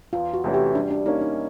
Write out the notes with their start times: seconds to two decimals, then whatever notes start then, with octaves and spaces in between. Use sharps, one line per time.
0.13 E2 F4
0.34 F#4
0.44 C3 E3 A3 C#4
0.54 G4
0.75 G3 D4
0.91 D4
1.06 A#3 C#4 D#4
1.21 D#4